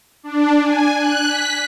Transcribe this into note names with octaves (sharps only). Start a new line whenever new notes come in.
D4
G#5
F#6
B6